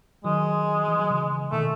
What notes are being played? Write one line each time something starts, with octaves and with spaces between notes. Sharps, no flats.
D#3 F#3 G#3
E3
F#3
C#3 E3
B2 D#3 A3